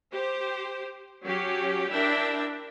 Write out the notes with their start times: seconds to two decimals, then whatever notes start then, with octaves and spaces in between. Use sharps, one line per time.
0.12 G4 C5
1.26 F#3 C#4 G4
1.91 D4 E4 A#4 E5 G5